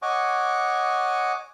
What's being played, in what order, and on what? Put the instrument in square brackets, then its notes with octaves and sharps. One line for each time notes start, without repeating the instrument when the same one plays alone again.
[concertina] C#5 D#5 F#5 G#5 C#6 D6